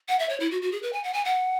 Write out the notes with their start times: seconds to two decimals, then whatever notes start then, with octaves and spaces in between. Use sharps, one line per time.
0.08 F#5
0.19 E5
0.29 C#5
0.40 E4
0.51 F#4
0.62 F#4
0.72 G#4
0.82 B4
0.93 G#5
1.04 F#5
1.14 G#5
1.25 F#5